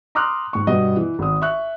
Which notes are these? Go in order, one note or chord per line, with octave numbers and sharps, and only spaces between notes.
A#5 C6 D6 D#6 F6 F#6
G#2 C#6
G2 B2 B3 D#5
E3
G#1 D#6
E5 C#6 F#6